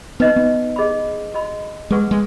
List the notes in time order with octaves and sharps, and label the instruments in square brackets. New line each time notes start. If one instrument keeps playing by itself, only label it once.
[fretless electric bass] B3 [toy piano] D#4 B4 D#5
[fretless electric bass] B3
[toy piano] G#4 D#5 B5
F#4 D#5 B5
[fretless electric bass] G#3 [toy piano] G#4 B4 F#5 C#6
[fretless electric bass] G#3